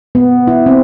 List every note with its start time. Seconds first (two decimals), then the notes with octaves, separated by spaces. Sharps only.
0.15 B3
0.47 E4
0.66 C4